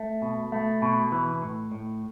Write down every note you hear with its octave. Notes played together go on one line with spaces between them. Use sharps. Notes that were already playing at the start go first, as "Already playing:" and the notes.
Already playing: A3
B2
A3
B2
E3
A2
A2